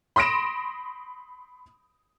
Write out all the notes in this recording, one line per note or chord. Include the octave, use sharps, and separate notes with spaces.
B5 C6 D#6 A#6 D7 E7